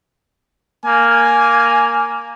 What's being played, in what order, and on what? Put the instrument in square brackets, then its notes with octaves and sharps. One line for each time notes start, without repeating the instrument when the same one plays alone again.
[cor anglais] A#3 [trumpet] G#5